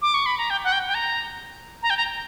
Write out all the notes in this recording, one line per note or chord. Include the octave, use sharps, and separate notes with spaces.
D6
C#6
B5
A#5
G5
F#5
G5
G5
A#5
A#5
G5
A#5